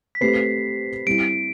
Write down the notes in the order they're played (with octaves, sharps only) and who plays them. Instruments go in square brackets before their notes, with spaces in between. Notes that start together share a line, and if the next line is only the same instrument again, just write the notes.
[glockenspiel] B6
[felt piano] A3 C4 G4 B4 [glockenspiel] C7
[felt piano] G3 C4 E4 [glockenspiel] D7